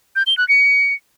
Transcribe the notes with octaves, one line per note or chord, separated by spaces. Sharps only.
G6
G7
F#6
C#7